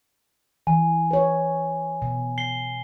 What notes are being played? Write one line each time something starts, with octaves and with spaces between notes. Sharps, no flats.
E3 G#5
B4 C#5
B2
C7 G7